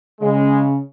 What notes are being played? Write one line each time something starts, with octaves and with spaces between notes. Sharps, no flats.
C#3 G#3